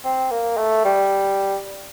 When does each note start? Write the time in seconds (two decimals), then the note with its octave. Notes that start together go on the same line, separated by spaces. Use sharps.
0.04 C4
0.31 A#3
0.57 A3
0.85 G3